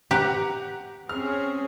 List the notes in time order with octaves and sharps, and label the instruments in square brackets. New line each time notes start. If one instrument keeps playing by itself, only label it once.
[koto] G4 B4 [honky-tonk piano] F#5 A#5
[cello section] C4 C#4 G#4 [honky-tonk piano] F6